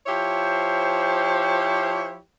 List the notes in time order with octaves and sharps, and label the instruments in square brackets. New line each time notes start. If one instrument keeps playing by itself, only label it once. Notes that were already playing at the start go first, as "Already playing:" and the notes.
[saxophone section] F3 E4 G4 C5 C#5